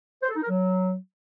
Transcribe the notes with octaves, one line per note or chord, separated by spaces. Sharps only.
C5
A4
D#4
A#4
F#3